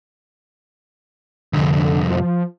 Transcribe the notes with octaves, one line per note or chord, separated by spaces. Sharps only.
C2 F2 D3
F3